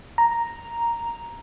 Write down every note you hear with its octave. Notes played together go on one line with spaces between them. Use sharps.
A#5